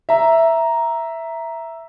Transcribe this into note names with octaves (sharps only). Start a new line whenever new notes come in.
E5 A#5